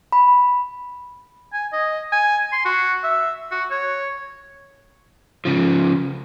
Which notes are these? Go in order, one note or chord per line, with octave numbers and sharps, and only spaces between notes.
B5
G#5
D#5
G#5
C6
F#4
E5
F#4
C#5
C#3 F3